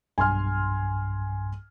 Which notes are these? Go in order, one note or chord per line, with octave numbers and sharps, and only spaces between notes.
B1 G2 G#5 C6 F6